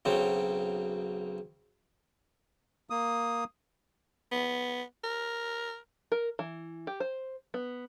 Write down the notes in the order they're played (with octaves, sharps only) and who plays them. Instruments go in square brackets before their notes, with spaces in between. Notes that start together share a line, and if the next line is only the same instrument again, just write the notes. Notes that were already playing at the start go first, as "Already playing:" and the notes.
[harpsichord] B1 C#3 F#3 C4
[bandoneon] A#3 D#6
[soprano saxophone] B3
A#4
[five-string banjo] A#4
E3
G4
C5
B3